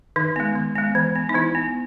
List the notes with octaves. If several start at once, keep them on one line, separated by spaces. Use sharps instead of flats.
D#3 D#4
G#3 B3
D#3
G#3 B3
E3
B3
D#4
E3 E4
B3